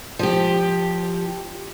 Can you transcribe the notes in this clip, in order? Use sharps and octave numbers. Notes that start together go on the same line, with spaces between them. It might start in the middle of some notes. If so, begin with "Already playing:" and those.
F3 G4